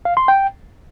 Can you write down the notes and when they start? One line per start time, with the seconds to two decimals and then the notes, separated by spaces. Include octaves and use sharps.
0.05 F5
0.17 C6
0.28 G5